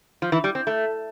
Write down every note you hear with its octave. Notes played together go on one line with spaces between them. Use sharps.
F3
E3
G3
C4
A3